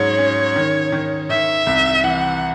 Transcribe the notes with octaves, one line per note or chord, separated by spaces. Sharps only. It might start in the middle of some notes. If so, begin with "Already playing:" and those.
Already playing: G#2 F#3 C#4 C#5
C#4
D#3
D#3
D#3 E5
C2
E3 F#5